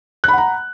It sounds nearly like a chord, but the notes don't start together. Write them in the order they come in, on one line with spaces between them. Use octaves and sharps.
F#6 B5 F#5 A#5